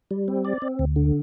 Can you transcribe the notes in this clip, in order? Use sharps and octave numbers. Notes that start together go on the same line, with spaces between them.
G3
C4
D5
C4
D2
D3